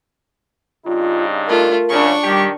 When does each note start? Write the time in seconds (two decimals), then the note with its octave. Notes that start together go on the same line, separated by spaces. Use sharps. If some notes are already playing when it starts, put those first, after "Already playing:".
0.86 G2 C#3 D#4 F4
1.48 A3 F4 A#4
1.90 F#2 C#3 D4 C#6
2.24 D#3 G3 G4